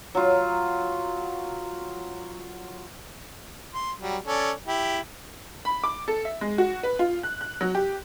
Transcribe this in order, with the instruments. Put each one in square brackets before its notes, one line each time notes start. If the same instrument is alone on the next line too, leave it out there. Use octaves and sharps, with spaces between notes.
[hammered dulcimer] F#3 F4
[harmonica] C6
F#3 G3
C#4 A4 D5
E4 G4
[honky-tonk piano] B5
D6
A4
E5
G#3
F#4
B4
F4
F#6
F#6
F#3
G4